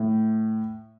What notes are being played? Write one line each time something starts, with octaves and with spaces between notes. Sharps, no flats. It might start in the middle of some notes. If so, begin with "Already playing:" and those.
Already playing: A2